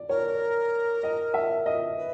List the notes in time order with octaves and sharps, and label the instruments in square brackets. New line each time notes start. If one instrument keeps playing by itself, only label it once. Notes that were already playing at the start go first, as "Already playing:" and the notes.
Already playing: [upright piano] D5
[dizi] A#4 [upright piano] C#5
[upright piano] D#5
E5
D#5
[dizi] B4